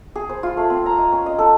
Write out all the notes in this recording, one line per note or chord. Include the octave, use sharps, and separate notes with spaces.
G#4
C5
F4
A3
C4
A#5
D#5
C#4
D#5
A4